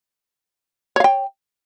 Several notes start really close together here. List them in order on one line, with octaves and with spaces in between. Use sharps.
C#5 F5 G5